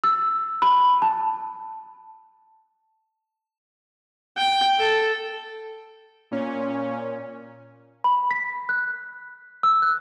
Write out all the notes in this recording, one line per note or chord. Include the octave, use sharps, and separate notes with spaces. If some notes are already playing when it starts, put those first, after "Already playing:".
E6
B5
A5
G5
A4
A#2 C#4
B5
B6
F#6
E6
F#6